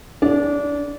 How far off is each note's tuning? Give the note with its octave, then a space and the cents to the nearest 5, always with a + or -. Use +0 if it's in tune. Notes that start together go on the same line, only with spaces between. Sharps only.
D4 -20